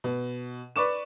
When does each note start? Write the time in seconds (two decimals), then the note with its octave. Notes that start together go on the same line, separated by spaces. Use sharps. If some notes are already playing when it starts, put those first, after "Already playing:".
0.04 B2
0.76 B4 D5 C#6 D6 E7